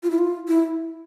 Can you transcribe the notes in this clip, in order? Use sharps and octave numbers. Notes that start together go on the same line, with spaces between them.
F4
E4
F4
E4